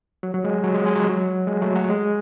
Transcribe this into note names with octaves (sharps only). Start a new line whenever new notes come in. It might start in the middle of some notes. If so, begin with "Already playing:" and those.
F#3
F#3
G#3
F#3
G#3
G#3
F#3
F#3
G#3
F#3 A3
F#3
G#3